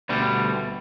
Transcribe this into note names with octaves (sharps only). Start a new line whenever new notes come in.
D2 B2 D3 G3